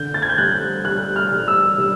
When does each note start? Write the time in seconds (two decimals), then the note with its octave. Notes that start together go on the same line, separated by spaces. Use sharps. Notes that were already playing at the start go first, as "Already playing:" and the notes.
Already playing: D3 G6
0.14 A6
0.22 G#6
0.29 G6
0.38 G3 F#6
0.84 G3 F#6
1.16 F6
1.32 G3
1.48 E6
1.78 G3